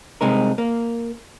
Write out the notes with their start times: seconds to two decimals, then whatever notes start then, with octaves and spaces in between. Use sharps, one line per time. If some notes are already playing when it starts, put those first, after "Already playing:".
0.21 C2 C3 G#3 D#4 A#4
0.58 A#3